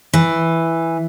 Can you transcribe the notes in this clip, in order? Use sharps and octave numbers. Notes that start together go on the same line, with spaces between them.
E3